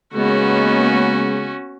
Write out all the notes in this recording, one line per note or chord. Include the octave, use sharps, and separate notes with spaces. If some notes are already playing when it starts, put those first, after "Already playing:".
C#3 G#3 A#3 B3 C#4 F#4